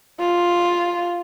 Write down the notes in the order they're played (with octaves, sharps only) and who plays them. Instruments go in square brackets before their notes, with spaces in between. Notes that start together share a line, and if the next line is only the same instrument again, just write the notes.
[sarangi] F4